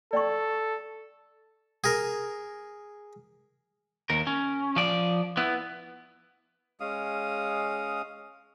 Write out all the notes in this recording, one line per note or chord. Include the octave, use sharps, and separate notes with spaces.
A4 D5 G5 C#6
G#4 A#4
D#2 A#4
C#4
F3 D5
B3 E4
G#3 C#4 F5 D#6